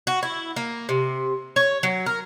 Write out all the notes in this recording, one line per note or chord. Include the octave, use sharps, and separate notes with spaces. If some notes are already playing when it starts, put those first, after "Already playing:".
F#4
E4
A#3
C3
C#5
F#3
A#4